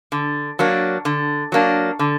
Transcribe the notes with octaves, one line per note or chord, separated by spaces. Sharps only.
D3
F#3 A#3 D4
D3
F#3 A#3 D4
D3